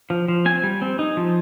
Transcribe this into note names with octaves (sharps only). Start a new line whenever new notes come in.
F3
F3
C4 G#5
G3
C4
D#4
F3